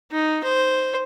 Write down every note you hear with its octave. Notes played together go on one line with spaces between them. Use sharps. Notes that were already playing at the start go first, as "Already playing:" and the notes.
D#4
C5